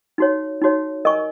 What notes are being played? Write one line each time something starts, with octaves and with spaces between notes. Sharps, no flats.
D#4 F#4 C#5
D#4 F#4 C#5
A#4 D#5 G#5 C#6